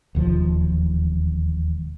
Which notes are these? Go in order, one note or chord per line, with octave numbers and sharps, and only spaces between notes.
E1 D#2 F3